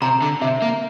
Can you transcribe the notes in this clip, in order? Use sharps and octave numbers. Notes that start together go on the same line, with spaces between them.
C3 A#5
D3
C3 E5
A#3